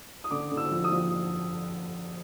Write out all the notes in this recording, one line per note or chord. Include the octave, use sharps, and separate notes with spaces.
D#6
D3 D6
D3
E6
F3
D#6
F3